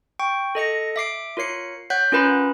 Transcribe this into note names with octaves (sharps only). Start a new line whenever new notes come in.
G5 C#6
A4 D#5 A#6 C#7
E5 D6 C7 D7
F4 A#4 C#5 C7 C#7
C#5 F#5 F#6 G6 B6
C#4 F4 A#4 B4 B5